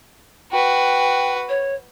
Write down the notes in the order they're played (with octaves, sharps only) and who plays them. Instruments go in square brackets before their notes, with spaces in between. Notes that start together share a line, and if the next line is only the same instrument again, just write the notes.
[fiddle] F#4 B4 [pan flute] G5
[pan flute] C#5